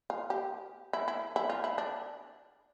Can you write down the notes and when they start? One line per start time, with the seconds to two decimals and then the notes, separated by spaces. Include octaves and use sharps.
0.10 F4
0.30 G4
0.93 E4
1.08 E4
1.36 E4
1.50 F4
1.64 E4
1.78 D4